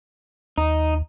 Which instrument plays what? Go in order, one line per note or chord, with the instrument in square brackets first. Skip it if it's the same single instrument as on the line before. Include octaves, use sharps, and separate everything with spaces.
[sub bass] D#2 [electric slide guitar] D#4